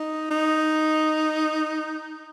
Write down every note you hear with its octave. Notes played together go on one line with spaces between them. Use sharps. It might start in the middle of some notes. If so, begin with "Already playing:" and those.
Already playing: D#4
D#4